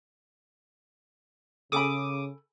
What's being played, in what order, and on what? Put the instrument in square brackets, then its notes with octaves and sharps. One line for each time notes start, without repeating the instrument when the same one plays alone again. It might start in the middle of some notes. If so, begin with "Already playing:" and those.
[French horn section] C#3 [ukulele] A4 G#5 B5 [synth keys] D6 D#6